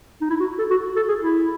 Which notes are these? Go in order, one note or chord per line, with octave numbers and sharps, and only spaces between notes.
D#4
E4
F#4
A4
F#4
A4
G#4
E4